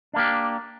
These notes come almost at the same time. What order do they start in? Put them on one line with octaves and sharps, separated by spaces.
D4 A#3 G4